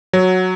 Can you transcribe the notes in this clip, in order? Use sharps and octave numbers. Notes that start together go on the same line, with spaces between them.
F#3